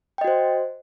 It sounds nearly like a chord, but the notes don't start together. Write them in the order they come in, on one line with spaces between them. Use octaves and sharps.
G5 D#5 F#4 C5